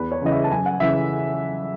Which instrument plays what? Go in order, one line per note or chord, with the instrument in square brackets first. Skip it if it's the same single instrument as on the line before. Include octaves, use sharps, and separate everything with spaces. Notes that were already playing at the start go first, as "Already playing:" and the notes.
Already playing: [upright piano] E2 B4
C#5
C#3 E3 D#5
E5
A5
F#2 G#5
F#5
C#3 E3 E5